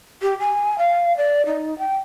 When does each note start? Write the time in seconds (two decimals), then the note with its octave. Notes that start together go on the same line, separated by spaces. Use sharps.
0.22 G4
0.40 G#5
0.78 F5
1.17 D5
1.46 D#4
1.79 G5